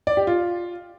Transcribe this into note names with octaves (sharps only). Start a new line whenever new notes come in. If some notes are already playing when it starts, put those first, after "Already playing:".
D5
G4
F4